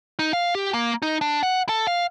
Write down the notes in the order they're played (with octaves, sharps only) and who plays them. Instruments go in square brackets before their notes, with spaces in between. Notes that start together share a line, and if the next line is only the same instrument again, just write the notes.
[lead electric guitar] D#4
F5
G4
A#3
D#4
D4
F#5
A4
F5